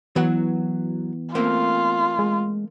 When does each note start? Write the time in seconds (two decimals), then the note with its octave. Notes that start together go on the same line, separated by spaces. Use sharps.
0.16 E3 F#3 B3 F#4 F#5
1.35 A3 A#3 C4 F4
2.19 G#3